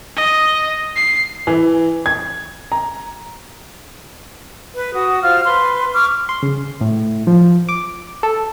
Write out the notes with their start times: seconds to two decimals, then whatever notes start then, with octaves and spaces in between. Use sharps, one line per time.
0.16 D#5
0.96 C7
1.47 E3
2.06 G#6
2.72 A#5
4.75 B4
4.93 F#4 D#6
5.22 F4 C5 F6
5.46 B4 C6
5.93 C#6 D6 F6
6.29 C6
6.43 C#3
6.81 A2
7.27 F3
7.69 D6
8.23 A4